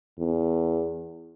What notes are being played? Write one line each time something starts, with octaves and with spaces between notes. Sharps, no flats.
E2